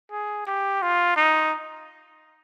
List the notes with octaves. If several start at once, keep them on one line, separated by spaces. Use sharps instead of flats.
G#4
G4
F4
D#4